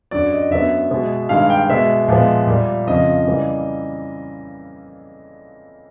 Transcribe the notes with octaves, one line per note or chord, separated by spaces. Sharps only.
F#2 D3 F#3 D5
D#5
F#2 D3 F#3 B3 E5
B2 G#3 B3
G2 D#3 G#3 F5
G5
B2 G#3 B3 E5
A#2 F3 G#3 B3
A#2 G3 A#3
F2 C#3 F3 D#5
C#3 E3 G3 A#3